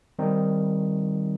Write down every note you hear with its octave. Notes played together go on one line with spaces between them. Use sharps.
D#3 G3 C4 D#4